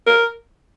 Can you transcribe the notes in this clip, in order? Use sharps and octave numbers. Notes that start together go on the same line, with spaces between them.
A#4